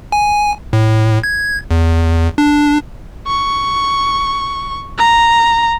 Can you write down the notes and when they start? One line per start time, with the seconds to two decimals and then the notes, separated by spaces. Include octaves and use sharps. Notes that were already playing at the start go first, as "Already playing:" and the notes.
0.12 G#5
0.73 A2
1.24 G#6
1.71 E2
2.38 D4
3.27 C#6
4.98 A#5